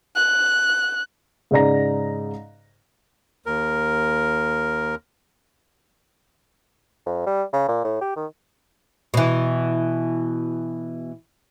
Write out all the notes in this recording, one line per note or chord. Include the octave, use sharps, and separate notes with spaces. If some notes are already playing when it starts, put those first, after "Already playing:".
F#6
G#2 C#3 D#4 D5 A#5 A#6
D#2 A#4
F2
G3
C#3
A#2
A2
G4
D#3
B2 E3